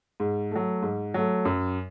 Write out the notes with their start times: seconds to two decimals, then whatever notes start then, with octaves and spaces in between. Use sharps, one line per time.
0.20 G#2
0.51 F#3 A3
0.82 G#2
1.14 F#3 A3
1.45 F#2